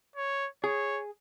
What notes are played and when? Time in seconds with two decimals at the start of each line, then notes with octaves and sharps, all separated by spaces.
0.16 C#5
0.64 G#4 C#5